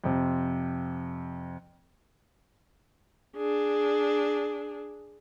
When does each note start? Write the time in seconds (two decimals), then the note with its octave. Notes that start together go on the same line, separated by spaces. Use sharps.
0.04 F2 C3
3.36 D4 G#4